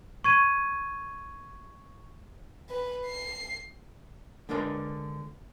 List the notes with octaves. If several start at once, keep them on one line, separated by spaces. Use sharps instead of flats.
C#6 G#6 D#7
B4
C7
D3 G#3 D4 A#4 B4 C6